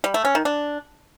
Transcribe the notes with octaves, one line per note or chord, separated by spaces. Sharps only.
G3
A3
C#4
D#3
D4